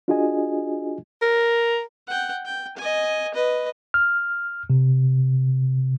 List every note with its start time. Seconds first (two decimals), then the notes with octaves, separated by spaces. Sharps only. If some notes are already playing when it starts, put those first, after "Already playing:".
0.08 D4 F4 F#4 G#4 D#5 G#5
1.22 A#4
2.07 F#5 G5
2.45 G5
2.77 D#5 G#5
3.34 B4 D#5
3.94 F6
4.70 C3